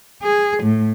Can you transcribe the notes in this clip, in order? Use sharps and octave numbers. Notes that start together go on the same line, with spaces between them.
G#4
A2